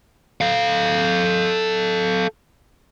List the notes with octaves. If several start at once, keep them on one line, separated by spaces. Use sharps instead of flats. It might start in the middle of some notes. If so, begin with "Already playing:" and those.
A4 F5